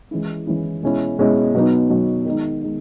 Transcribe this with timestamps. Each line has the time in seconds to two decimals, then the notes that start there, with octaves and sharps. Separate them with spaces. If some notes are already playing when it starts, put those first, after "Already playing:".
0.11 E3 G#3 C#4 E4
0.47 E3 G#3 C#4 E4
0.82 B2 G#3 C#4 E4
1.18 B2 G#3 C#4 E4
1.54 B2 F#3 B3 D#4
1.90 B2 F#3 B3 D#4
2.25 D#3 G#3 D#4
2.61 D#3 G#3 D#4